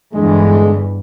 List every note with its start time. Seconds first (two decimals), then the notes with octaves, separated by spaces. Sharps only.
0.13 E2 G2 D3 G#3